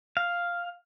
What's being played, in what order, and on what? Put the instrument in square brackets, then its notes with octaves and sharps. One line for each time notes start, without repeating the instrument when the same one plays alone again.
[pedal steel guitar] F5